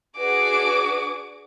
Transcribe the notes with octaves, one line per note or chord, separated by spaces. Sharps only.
D4 F#4 G#4 B4 D6